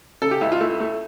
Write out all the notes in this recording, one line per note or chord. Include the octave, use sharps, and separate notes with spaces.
C#3 A4
G4
C#2 E4
F4
A3 E4
A3